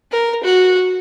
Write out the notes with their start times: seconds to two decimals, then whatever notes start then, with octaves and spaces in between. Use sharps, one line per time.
0.12 A#4
0.43 F#4